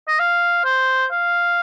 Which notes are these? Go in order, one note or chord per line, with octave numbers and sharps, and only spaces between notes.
D#5
F5
C5
F5